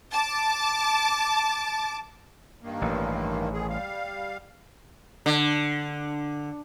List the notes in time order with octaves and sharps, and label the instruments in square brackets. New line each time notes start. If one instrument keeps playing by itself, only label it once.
[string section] A5 D6
[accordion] G2 D#3 A#3
[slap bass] A1
[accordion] D#3 G#4
G3 F5
[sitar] D3